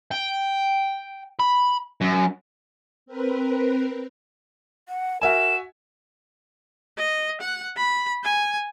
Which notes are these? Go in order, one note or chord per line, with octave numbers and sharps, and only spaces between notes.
G5
B5
F#2
C4 A#4 B4
F#5
F#4 A#4 E5 G#5 E7
D#5
F#5
B5
G#5